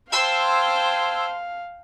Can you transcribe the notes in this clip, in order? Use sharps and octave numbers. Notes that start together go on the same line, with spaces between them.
C5 F5 G5 A5 C6 E6 G#6